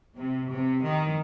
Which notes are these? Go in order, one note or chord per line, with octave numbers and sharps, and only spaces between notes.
C3
C3
D#3